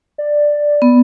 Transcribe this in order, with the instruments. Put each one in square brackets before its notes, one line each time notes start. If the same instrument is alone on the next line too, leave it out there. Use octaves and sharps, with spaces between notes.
[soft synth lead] D5
[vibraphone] B3